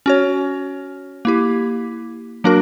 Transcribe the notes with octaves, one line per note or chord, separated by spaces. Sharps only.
C#4 F#4 C#5
A#3 E4 G4
F#3 A#3 D4 F#4 A#4